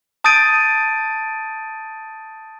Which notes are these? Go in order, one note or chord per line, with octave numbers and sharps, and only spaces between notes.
A5 D#6 G6 A6 D7 D#7